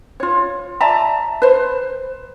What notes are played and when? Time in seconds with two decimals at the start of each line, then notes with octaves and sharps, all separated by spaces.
0.20 F4 C#5
0.81 D5 E5 A5 A#5
1.42 B4 C5